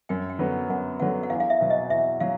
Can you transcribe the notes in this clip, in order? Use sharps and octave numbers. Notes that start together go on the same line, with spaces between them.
F#2 G5
G5
D3 F#3 B3
F#2 F#5
D3 F#3 B3 F#5
F#5
E2 F5
F5
E5
B2 F#3
D#5
E2 E5
F#3 F5